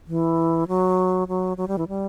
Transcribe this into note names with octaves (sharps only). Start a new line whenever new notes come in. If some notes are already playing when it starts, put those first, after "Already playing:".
E3
F#3
F#3
F#3
G3
E3
G3